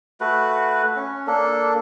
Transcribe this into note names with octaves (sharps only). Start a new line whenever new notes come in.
A3 F#4 B4
C#4
A#3 D4 A4